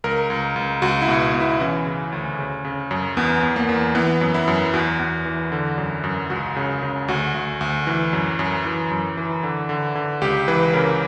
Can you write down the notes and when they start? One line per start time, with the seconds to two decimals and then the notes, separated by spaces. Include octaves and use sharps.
0.04 C#2 A#4
0.30 C#2
0.56 C#2
0.82 C#2 F#4
1.02 E4
1.08 B2
1.34 B2
1.41 E4
1.60 E3 C#4
1.86 C#3
2.12 D2
2.39 C#3
2.65 C#3
2.91 F#2
3.17 E2 B3
3.43 E2
3.56 A#3
3.69 E2
3.95 E3 B3
4.21 F#2
4.34 E4
4.48 F#2
4.73 E2 F#4
4.99 E2
5.25 E3
5.52 D3
5.78 F#2
6.04 F#2
6.30 C#2 F#4
6.56 C#3
6.83 C#3
7.08 D2 F#4
7.34 D2
7.61 D2
7.87 E3
8.13 F#2
8.39 F#2
8.65 E3
8.91 F#2
9.17 E3
9.43 D3
9.69 D3
9.95 D3
10.21 C#2 G4
10.48 E3 B4
10.73 C#3 A#4